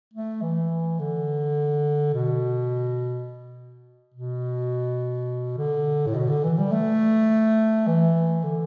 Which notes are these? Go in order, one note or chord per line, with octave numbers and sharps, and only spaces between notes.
A3
E3
D3
B2
B2
D3
A2
B2
D3
E3
G3
A3
E3
D3